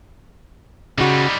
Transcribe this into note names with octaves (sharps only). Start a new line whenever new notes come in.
C#3 G3 D#4 F#4